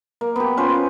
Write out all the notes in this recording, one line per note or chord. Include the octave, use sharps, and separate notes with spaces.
A#3
B3 G4
C#4 F4 B4 C5